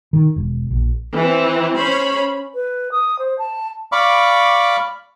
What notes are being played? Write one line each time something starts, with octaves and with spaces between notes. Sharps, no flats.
D#3
E1
A#1
E3 C4
C#4 C5 C#5 B5
B4
D#6
C5
A5
D5 F5 B5 C#6 D6